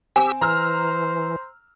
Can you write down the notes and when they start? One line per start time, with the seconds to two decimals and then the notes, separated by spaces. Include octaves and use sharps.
0.16 C4 G4 G#5 E6
0.41 E3 C5 A#5 E6 F6